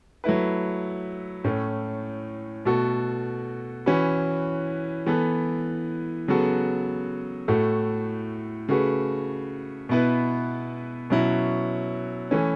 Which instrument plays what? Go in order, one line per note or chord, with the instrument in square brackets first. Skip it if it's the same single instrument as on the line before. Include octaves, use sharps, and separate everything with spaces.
[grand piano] F#3 A3 E4 B4
A2 A3 C#4
B2 A3 F#4 A4
E3 C#4 F#4 B4
E3 B3 A4
C#3 F#3 B3 F#4 A4
A2 A3 F#4 A4
C#3 A3 F#4 B4
B2 B3 E4 B4
B2 F#3 C#4 E4
E3 A3 C#4